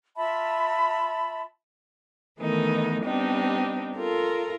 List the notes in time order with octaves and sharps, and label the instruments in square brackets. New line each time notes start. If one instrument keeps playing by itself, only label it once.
[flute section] F4 E5 A5 B5
[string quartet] D#3 E3 A3 B3 D#4 A#4
G3 B3 C4 D4 D#4 G4
F4 A4 A#4 A#5